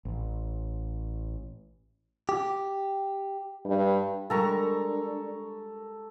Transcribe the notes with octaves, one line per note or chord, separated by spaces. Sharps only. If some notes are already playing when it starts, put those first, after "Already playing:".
A1
G4
G2
G3 G#3 D4 A4 A#4 A#5 C#6